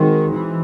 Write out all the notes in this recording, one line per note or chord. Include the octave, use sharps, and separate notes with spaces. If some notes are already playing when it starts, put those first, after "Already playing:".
Already playing: D#3 G#3 C4 D#4 F#4
E3